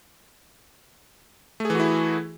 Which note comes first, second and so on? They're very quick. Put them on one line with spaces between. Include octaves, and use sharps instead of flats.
A3 G#4 E3 F#4 E4